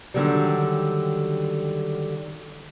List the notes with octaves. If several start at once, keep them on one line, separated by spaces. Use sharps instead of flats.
D3 D#3 F#3 G3